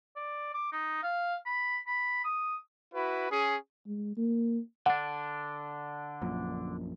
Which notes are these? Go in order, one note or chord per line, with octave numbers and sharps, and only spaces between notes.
D5
D6
D#4
F5
B5
B5
D#6
E4 F#4 B4
C#4 G#4
G#3
A#3
D3 D4 F#5
A#1 F#2 A#2